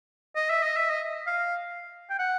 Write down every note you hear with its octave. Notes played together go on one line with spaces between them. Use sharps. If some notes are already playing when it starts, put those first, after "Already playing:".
D#5
E5
D#5
E5
D#5
F5
G5
F#5